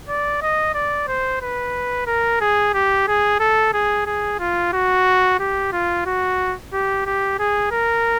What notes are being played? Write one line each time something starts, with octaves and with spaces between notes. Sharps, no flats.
D5
D#5
D5
C5
B4
A#4
G#4
G4
G#4
A4
G#4
G#4
F4
F#4
G4
F4
F#4
G4
G4
G#4
A#4